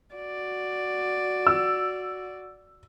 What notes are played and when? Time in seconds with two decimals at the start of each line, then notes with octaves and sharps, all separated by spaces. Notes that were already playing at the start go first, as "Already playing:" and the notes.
0.15 F#4 D5
1.47 E6